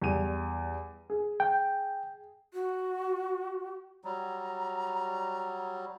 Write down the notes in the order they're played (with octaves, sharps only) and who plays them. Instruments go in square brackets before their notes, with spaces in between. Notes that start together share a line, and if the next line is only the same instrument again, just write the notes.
[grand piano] E2 G3 D#7
G#4
[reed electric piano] G5
[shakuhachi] F#4
[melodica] F#3 G3 [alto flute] A#5